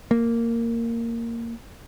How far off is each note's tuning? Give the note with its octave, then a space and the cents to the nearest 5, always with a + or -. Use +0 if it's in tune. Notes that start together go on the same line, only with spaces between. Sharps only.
A#3 -10